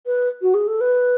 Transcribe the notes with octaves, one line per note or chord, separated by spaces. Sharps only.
B4
F#4
G#4
A4
B4